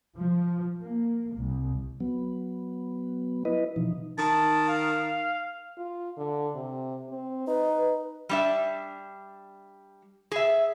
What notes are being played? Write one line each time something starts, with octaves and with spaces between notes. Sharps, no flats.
F3
A#3
C2
F#3 B3
E4 B4 D#5
B2 E3 F3 D#4
D#3 A5
F5
F4
D3
C3
C4
D#4 B4
G3 D4 E5
G#4 E5